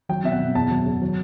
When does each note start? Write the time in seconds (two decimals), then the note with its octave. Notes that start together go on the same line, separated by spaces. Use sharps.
0.09 F#3 G5
0.24 B2 E5
0.32 F#5
0.39 B2
0.55 E2 A5
0.71 F#3
0.86 C#3
1.02 F#3